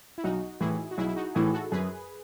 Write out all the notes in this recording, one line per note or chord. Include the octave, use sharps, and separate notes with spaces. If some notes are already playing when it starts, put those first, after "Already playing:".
E4
B1 D#4 F#4
A2 E3 E4 G#4
F#4
B1 E4 G#4
E4
D#4 F#4
A2 E3 E4 G#4
F#4 A4
F#2 G#4 B4